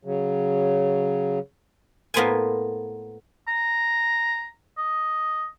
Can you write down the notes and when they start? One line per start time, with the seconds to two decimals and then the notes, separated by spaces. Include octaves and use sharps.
0.05 C#3 F#3
2.14 A2 A#3 B3 C5 G5 G#5
3.48 A#5
4.78 D#5